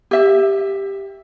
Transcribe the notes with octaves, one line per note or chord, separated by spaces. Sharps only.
G4 E5